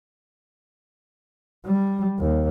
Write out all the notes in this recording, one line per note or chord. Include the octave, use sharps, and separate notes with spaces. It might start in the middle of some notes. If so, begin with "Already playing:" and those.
G3
D#2